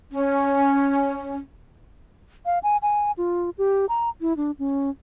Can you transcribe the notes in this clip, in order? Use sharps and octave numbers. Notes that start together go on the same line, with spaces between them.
C#4
F5
G#5
G#5
F4
G4
A#5
E4
D4
C#4